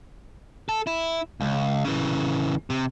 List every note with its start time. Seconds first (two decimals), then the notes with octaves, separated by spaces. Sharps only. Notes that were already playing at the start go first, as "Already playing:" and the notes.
0.69 A4
0.87 E4
1.40 C#2
1.85 C#3 E3
2.70 C3